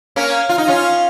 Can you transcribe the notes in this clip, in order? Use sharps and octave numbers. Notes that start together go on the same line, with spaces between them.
A#3 C#4
F4
D#4
C#4 F4